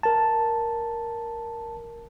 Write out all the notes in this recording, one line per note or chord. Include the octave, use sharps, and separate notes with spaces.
A#4 A5